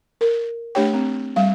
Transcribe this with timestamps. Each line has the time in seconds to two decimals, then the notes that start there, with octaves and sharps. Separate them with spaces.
0.21 A#4
0.75 A3 D4 G4 C#5 G5
0.94 C4
1.36 G3 F5